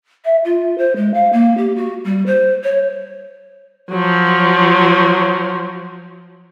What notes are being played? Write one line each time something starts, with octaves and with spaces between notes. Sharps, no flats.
E5
F4
C5
G#3
F5
A#3
G4
F#4
G3
C5
C#5
F3 F#3